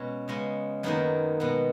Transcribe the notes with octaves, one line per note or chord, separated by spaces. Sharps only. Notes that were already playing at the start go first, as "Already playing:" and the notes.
Already playing: B2 G#3 B3 C#4
C#3 G#3 B3
F#2 D#3 A#3 B3
B2 G#3 B3